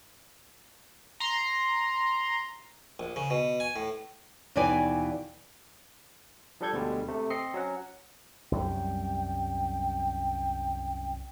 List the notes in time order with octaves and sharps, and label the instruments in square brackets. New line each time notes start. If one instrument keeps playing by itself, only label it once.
[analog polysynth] A#5 C6
[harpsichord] A#1
C#3
B2
G#5
A2
[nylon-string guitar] D#2 B2 E3 B4 D5 G#5
[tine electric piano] F3 G3 D4 A4 G6 G#6
D2 B2 D3 G3 G#3
C3 A3
C4 D#5 C7 C#7
F#3 C#4 F#5
[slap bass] C2 F#2 G3 [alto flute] G5